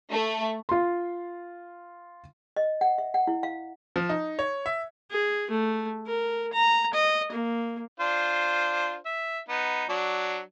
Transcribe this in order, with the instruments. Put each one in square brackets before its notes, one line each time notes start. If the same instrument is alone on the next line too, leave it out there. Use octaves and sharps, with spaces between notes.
[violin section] A3
[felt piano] F4 C6
[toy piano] D#5
F#5
E5
F#5
E4
F5
[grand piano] F3
D#4
C#5
E5
[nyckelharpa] G#4
A3
A#4
A#5
D#5
A#3
[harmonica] D4 F4 C5
E5
B3 D#4
F#3 D4